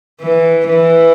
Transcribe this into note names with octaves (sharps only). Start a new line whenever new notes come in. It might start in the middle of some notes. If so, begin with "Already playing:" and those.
E3
E3